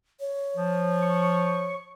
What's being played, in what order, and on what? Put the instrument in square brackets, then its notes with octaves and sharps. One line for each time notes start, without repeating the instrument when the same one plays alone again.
[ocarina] C#5
[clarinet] F3
[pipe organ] C#6